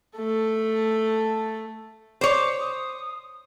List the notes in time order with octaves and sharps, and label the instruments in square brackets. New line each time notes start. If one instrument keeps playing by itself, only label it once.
[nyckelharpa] A3 A4
[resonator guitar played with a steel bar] C5 C#5 [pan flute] D6
[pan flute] D#6